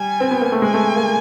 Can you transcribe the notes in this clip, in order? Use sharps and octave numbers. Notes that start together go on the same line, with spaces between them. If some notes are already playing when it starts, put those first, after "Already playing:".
Already playing: G3 G#5
C4
B3
A#3
A3
G#3 G#5
A3
A#3